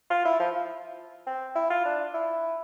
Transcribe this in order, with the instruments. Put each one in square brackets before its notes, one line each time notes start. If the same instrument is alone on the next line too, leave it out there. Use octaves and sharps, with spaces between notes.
[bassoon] F4
E4
F3
C4
E4
F4
D4
E4